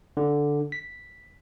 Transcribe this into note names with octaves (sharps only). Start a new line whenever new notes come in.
D3
B6